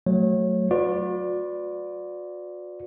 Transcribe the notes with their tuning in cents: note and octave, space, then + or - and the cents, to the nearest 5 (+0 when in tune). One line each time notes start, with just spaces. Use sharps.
F#3 +5 A3 +0 C#5 -25
F#4 -40 B4 +35 D5 +0